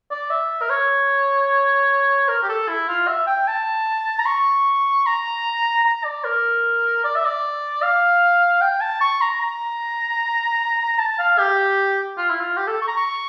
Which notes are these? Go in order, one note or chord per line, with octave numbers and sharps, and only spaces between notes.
D5
E5
A#4
C#5
A#4
G4
A4
E4
F4
E5
G5
A5
A#5
C#6
A#5
A#5
D5
A#4
D5
E5
D5
F5
G5
A5
C#6
A#5
A#5
A5
F5
G4
F4
E4
F4
G4
A4
C#6
A#5
C#6